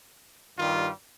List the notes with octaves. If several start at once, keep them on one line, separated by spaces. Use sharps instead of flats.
G2 D#3 G3 F4